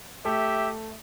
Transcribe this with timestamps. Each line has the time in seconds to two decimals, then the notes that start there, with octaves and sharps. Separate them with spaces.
0.25 A3 G4 E5